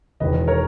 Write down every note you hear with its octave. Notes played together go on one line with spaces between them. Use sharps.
E1 E2 D#3 G#3 B4 D#5
A#4 C#5